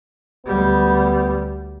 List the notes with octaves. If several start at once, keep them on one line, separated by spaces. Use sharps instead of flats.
D2 G3 B3